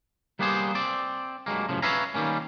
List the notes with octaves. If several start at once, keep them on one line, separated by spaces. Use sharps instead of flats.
G3 A#3 B3 G4 G#4 C5
C4 D5
G2 F#3 G#3 A#3
F#2 A2 C#3 F3
B4 C#5 E5 F5 G#5 A#5
D#3 G3 A#3 C#4